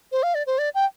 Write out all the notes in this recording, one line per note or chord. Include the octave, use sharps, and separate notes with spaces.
C5
F5
D5
C5
D5
G5